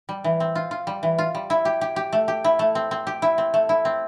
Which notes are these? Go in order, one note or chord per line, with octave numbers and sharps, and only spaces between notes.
G3
E3
C4
F4
F4
G3
E3
F4
G3
E4
G4
G4
G4
A3
G4
E4
A3
C4
C4
G4
E4
C4
A3
E4
C4